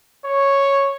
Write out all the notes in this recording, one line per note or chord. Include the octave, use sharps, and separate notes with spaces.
C#5